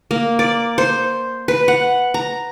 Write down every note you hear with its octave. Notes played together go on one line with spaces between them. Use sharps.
A#3
D5
C5
B4
F#5
A#5